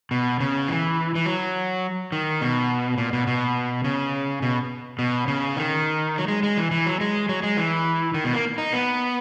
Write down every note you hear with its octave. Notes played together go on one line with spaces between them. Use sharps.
B2
C#3
E3
E3
F#3
D#3
B2
A#2
B2
B2
C#3
B2
B2
C#3
D#3
F#3
G#3
G#3
E3
E3
F#3
G#3
F#3
G#3
E3
D#3
B2
A#3
D#4
B3